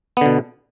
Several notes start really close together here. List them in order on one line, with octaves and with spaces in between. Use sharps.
B3 D3 B2